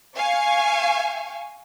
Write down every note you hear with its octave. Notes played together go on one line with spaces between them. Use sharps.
F5 G#5 C#6